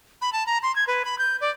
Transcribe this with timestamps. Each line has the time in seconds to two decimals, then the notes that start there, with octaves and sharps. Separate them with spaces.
0.22 B5
0.33 A5
0.47 A#5
0.63 C6
0.76 G#6
0.88 B4
1.05 B5
1.19 G6
1.41 D5